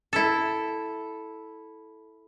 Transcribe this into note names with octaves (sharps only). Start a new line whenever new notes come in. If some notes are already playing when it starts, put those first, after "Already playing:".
E4 A4